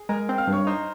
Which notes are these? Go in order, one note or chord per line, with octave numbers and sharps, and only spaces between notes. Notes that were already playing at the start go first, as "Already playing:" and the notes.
Already playing: G#4
G#3 A#4 A#5
C4
F5 F6
G2
C#5 C#6
D#4 C5 C6